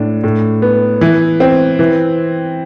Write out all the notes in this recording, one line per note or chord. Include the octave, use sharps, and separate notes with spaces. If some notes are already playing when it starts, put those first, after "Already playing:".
Already playing: A2 D4
A2
B3
E3
C4
E3